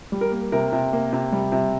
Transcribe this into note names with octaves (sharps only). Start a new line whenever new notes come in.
G3
A#4
A#3
C3 A#4
C3
A#3
C3
G3
C3